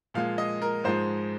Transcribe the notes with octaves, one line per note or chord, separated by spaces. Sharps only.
A#2 F3 G#3 F5
D#5
A#4
G#2 F3 G#3 C5